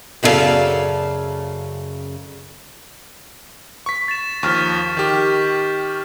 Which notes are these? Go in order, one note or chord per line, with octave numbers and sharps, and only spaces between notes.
F#2 C#3 E4 A4 D5 F5
C#6 B6
A6 E7
D#2 F3 C#6 F6 B6
D#3 G4